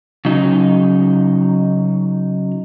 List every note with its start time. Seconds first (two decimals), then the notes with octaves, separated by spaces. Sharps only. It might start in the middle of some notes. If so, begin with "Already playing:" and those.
0.25 C#3 F#3 D#4